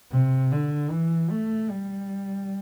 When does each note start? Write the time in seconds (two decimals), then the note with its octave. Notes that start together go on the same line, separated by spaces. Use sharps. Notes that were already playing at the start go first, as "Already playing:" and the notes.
0.11 C3
0.52 D3
0.90 E3
1.30 A3
1.69 G3